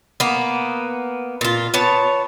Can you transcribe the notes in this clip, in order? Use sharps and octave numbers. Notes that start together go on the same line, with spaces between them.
A#3 B3
A#2 F4
B3 C#5 A5